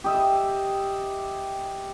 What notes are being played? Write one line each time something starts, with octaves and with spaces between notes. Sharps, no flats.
G4 D#5 E5